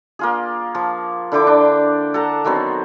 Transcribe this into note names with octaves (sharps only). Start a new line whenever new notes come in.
A#3 F4 G#4
F3
D3 E4 G5 D6
D4
A4 F#5 A5 A#5
D#3 F#3 B3 C4